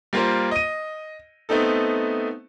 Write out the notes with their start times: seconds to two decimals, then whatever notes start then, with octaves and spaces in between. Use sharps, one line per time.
0.13 G3 A#3 F4 A#4 C5
0.51 D#5 D#7
1.49 A3 B3 C4 D#4 A4